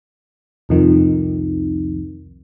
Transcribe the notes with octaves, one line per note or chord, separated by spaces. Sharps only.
C2 F2 D#3